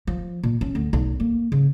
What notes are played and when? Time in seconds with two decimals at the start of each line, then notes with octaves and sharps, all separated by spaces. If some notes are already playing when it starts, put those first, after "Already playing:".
0.07 F3
0.43 A#2
0.61 C#4
0.75 D2
0.93 B1
1.20 A#3
1.52 C#3